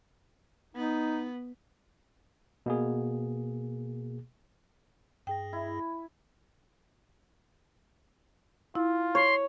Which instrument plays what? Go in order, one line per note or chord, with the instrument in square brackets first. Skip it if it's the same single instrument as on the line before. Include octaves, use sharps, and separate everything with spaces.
[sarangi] B3 [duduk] D#4
[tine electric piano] B2 A#3 G#4
[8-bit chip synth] G2 G#4 A#6 [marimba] G5
[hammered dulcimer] E4
[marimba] E4 [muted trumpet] F4
[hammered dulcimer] C#5 [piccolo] C6